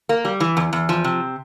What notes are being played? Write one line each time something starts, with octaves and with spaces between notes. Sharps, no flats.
A#3
G3
E3
E2
E2
F3
C3